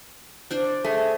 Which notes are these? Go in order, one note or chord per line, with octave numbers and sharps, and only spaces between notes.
D4 C5 D5
A3 G#4